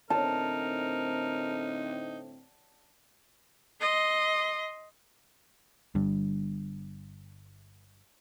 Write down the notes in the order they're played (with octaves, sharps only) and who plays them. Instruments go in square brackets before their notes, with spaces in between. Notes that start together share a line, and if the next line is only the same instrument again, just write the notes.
[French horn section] A2 D3 C4 [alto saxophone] D#4 [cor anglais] A#4 [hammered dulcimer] A5
[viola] D#5 C6
[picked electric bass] G1 G2